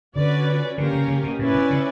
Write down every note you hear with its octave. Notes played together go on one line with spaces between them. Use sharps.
D3 C#4 F#4 B4 D5
D3 A#3 C#4 G4 A#4
C#3
C#3
B2
A#2 C#4 E4 B4 D5
B2
C#3